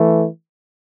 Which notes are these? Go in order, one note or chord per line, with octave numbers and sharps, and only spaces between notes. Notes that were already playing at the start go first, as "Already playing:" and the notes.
Already playing: E3 A3